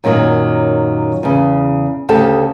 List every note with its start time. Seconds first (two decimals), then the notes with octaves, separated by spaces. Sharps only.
0.04 F#2 A#2 D#3 F#3 A#3
1.23 E2 C#3
2.09 D2 C#3 G4 A4 A5